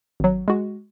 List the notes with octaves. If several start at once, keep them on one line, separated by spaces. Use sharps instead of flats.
G#1 F#3
G#3 F#4